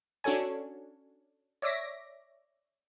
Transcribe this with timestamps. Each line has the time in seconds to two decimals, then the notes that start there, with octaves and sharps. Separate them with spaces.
0.24 C#4 D4 F#4 A4 C#5 G#5
1.62 C#5 D5 E5 D6 A#6 B6